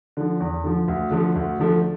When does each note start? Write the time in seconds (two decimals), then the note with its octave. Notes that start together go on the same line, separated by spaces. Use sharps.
0.17 D3 F3
0.40 E2
0.64 D3 F3
0.88 D2
1.11 D3 F3 A3
1.35 D2
1.59 D3 F3 A3